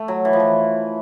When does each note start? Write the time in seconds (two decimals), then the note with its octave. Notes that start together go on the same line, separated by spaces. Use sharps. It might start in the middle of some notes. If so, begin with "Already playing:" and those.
Already playing: A3
0.08 F#3
0.25 E3
0.33 F3
0.40 E3